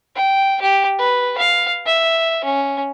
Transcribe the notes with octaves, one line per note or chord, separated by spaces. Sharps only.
G5
G4
B4
F5
E5
C#4